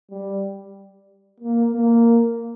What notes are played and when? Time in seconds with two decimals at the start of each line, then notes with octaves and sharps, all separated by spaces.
0.11 G3
1.40 A#3
1.72 A#3